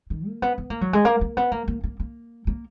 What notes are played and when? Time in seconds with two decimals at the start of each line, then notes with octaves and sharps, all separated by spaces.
0.10 D#3
0.27 A#3
0.42 B3
0.58 B3
0.70 A#3
0.81 F#3
0.93 G#3
1.05 A#3
1.21 A#3
1.37 B3
1.52 A#3
1.68 A#3
1.84 A#3
2.00 A#3
2.47 A#3